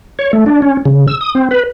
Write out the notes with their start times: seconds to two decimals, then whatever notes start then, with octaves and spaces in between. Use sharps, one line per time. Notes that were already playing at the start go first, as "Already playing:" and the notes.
0.19 C#5
0.33 A3
0.46 D4
0.62 C#4
0.86 C#3
1.08 E6
1.21 D#6
1.35 C4
1.51 B4